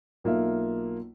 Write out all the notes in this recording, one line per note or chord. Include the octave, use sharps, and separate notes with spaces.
B1 A#3 F4 E5